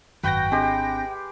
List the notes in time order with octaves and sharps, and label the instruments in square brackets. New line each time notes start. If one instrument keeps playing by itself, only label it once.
[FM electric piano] G#1 G6 A#6 [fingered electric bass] F#2 [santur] F#4 B4 [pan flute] G5
[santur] G#3 G4 [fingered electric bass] C4 D4